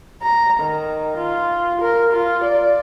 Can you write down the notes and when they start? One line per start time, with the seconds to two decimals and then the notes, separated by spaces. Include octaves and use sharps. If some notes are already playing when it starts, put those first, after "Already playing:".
0.22 A#5
0.60 D#3
1.17 F4
1.82 A#4
2.12 F4
2.44 D5